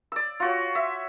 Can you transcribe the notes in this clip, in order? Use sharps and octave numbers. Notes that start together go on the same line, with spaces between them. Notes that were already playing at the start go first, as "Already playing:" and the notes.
D5 E6
F4 F#4 C#5
E5